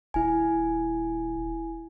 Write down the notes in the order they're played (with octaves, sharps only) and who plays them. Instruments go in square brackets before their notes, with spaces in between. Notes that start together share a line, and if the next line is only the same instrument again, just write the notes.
[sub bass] D#1 [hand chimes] E4 G#5